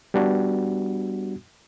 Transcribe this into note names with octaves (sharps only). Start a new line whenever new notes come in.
G3 B3 D4 F#4